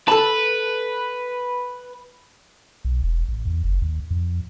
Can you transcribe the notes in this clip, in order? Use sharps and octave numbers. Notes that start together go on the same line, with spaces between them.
A4 B4 A5
B1
E1
A1
E2
F#1
D#2
F2